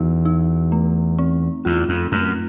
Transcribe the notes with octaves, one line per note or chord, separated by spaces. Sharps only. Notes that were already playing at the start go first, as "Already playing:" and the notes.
Already playing: E2 B3 D#4 F#4
D#4
A3
C4
E2 F4
F2
F#2 A3